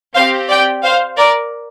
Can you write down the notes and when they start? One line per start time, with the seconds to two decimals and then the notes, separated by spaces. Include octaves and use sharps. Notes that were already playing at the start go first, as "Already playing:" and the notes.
0.15 C4 C5 F5
0.20 G4
0.49 D5 G5
0.83 C5 F5
1.17 A#4 D5